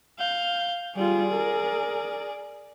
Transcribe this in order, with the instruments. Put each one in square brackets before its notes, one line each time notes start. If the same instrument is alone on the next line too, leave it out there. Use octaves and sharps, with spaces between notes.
[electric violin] F5 G6
[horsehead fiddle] G3 F4 [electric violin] G#4 D5
[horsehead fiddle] A#4